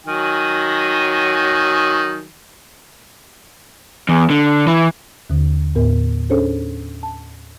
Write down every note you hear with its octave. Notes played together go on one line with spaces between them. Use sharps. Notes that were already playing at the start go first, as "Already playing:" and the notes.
D#3 F#3 G#5
E2
D3
E3
D#2 D3
D#2 A2 B3 A#4
C#4 D4 G#4 A4 C5 C#5
A5